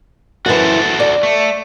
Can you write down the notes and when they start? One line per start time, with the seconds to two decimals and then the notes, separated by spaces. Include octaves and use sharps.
0.46 F#2 E3 F#4 A4 C5
1.00 D5
1.23 A3